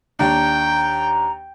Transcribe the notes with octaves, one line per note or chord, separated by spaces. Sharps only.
D#2 D4 G5 A#5